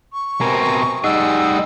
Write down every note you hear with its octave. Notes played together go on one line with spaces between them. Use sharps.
C#6
B2 C4 A#4 G#5 A#5
G3 D#4 G#4 D#5 F#5 E6